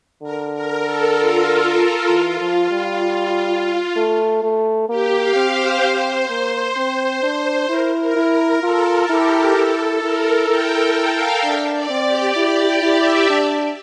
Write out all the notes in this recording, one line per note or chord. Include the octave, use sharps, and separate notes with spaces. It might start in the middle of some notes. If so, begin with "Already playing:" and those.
D3 A#4
A#4
A4
F4
E3
F3
G3
A3
A3
A#3 G4
F5
C4
C5
C4
A#3
C4
D4
E4 A#4
A#4
E4
A#4
F4 A4
E4 G4
E4 A4
E4 A#4
E4 G5
G5
F5
D4 E5
D5
C4
G4
E4
G4
E4
E5
D4 D5